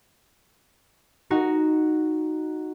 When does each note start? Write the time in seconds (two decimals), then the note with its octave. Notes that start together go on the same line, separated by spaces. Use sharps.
1.30 D#4 F#4